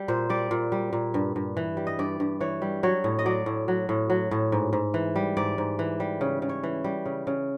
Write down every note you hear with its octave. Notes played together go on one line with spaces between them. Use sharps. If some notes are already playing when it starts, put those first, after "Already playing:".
Already playing: G3
A#2 C5
G3 D5
A#2
G3
A#2
G2
G2
E3
G3
D#5
G2 D5
G2
E3 C#5
G3
F#3 C#5
A2
D#5
F#3 D5
A2
F#3
A2
F#3
A2
G#2
G#2
E3
G3
G#2 D5
G#2
E3
G3
C#3
C#3
C#5
E3
G3
C#3
C#3